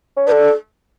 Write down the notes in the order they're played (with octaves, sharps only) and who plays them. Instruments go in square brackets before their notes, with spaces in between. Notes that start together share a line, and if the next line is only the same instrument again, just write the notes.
[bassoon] C#4
[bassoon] D4 [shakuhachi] B4
[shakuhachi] A4